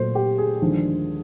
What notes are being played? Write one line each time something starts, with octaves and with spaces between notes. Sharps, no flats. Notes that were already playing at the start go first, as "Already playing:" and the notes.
Already playing: A#2 F#3 A3 C5
G4
G#4
D#2 D3 F3 G#3